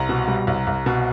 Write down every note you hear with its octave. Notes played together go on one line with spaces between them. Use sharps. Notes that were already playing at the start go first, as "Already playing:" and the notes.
Already playing: C2 A#5
B2
G3
C2
C2
B2